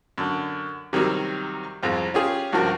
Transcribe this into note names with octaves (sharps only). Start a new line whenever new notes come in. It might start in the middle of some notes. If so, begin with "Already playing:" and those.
F#2 D3
C3 D#3 F#3 G3
C2 F2 G#3
C#4 F4 G4 G#4
C#2 G2 F3 F#4 A#4